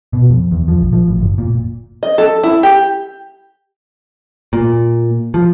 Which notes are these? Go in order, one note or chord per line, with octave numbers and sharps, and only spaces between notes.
B2
F2
E2
F3
A#1
F3
A1
F#1
A#2
D#5
A4
E4
G4
A#2
F3